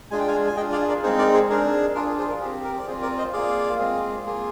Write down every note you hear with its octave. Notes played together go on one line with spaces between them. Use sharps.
G#3 D4 F4 G#4 G#5
G5
F5 G#5
G#5
D4 F4 G#4 D#5 G5
D5 F5
A#4 D5
G#3 C4 D#4 G#4 C5
A#4 D5
G#4 C5
D4 G#4 A#4
D4 F4 G#4 A#4
G#4
G#4 C5
A#4
C4 G4 G#4
A#4
D5
C4 F4 G#4 C5
A#4 D5
C5 D#5
A#3 F4 G#4 D5 F5
G#3 C4 F4 G#4
A#3 F4 G#4